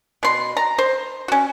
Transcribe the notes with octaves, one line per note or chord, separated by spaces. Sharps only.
B2 C6
A#5
C5
C#4 F#4